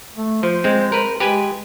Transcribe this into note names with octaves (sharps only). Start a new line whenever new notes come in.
A3
F3 C5
G#3 C4
A#4 B4
G#3 G4 B4 G#5